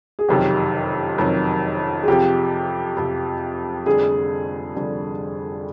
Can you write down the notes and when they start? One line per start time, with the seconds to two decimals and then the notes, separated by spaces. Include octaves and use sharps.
0.19 G#4
0.28 F#1 F2 C3 D#3 F#3 G4
1.18 F#1 F2 C3 D#3 F#3
2.03 G#4
2.08 F2 C3 F3 G4
2.97 F2 C3 F3
3.86 F1 F2 D3 G3 G#4
4.76 F1 F2 D3 G3